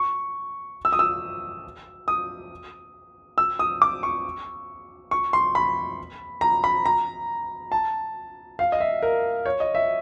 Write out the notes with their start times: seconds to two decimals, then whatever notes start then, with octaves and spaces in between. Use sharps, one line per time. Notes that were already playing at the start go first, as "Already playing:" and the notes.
Already playing: C#6
0.85 E6
0.93 D#6
0.99 E6
2.08 D#6
3.38 E6
3.59 D#6
3.82 D6
4.03 C#6
5.11 C#6
5.33 C6
5.55 B5
6.41 A#5
6.64 B5
6.85 A#5
7.72 A5
8.59 F5
8.72 D#5
8.80 E5
9.02 A#4
9.46 C#5
9.60 D#5
9.75 E5